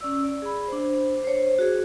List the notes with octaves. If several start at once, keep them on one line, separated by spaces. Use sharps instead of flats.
C#4 D5 E6
D5
G#4 B5
D4 C5
C5 C#5
F#4 G#4